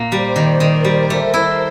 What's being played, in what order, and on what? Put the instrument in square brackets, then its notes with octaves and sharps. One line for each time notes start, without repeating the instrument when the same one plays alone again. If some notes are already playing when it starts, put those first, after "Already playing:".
Already playing: [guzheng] A#2 A#3
[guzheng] G3 [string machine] C5 D5
[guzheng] D#3
[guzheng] D#3 [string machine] A#4 C5
[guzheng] G3
[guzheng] A3 [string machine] A#4 C5
[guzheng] E4